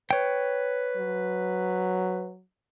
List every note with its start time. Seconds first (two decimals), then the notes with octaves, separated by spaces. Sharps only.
0.11 B4 C#5 G5
0.97 F#3